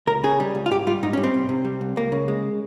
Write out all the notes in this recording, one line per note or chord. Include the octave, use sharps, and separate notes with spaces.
C#2 A#4
C#3 G#4
G3
C#2
F4
G#2 G4
G3 F4
G#2 D#4
C#4
G3
C4
C2
C3
G3
C2
C#2 A#3
C#3
G#3